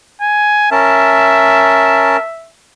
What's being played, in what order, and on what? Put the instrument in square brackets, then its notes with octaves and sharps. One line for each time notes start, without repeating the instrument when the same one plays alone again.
[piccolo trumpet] G#5
[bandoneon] C#4 A#4 A5 [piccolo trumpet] E5